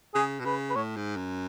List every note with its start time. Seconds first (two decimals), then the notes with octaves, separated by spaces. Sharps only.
0.14 C#3 G#4
0.40 B2
0.45 C#3 B4
0.70 B4
0.76 A2 C#5
0.96 G#2
1.16 F#2